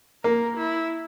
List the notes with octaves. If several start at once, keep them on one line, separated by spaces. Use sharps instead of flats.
A#3 A#4
E4